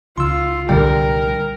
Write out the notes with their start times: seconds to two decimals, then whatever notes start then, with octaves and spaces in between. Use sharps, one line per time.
0.18 C#2 F4 C6 E6
0.69 C2 A#2 D3 G3 A#4 G5